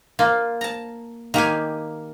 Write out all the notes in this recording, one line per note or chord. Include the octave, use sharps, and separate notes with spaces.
A#3 F4
A5 A#5
D#3 A#3 G4 G#5